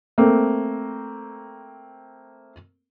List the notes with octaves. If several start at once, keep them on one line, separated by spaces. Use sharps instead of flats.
A3 A#3 C4